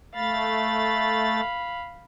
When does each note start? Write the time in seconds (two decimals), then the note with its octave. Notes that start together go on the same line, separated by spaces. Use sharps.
0.15 A3 F5 B5 A6